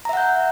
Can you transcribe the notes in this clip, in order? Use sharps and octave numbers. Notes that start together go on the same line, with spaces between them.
E5 F#5 A#5 G6